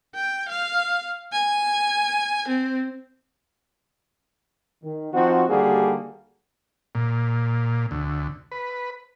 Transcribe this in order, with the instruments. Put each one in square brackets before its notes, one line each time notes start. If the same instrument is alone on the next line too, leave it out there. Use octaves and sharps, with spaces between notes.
[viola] G5
F5
G#5
C4
[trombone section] D#3
F3 C4 D#4 F#4
D#2 D3 G3 A#3 F#4 G#4
[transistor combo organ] A#2
D2
B4